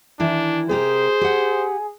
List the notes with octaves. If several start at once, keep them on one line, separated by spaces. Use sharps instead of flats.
D#3 E3 D4 E4
C3 G4 G#4 A#4 C5
G4 F#5